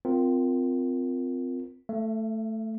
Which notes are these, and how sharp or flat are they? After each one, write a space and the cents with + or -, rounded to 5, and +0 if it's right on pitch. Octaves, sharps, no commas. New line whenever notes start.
C4 -15 F4 +5 A#4 +0
A3 +0 E5 +40